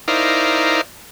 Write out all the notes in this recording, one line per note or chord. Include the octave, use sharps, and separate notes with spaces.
D#4 E4 A#4 C5 D5 F5